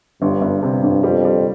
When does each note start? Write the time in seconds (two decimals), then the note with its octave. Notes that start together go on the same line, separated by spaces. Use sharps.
0.22 G1 G2
0.42 G1
0.63 G2 C3
0.84 G1
1.03 F2 G3
1.24 G3